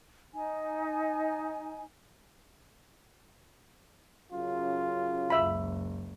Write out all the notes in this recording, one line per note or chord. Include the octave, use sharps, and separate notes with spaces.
D#4 G#5
F#2 C#3 F4
F#1 C#2 E5 B5